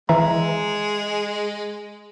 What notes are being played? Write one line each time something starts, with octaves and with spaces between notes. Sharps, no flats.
E3 G#3 E5 A#5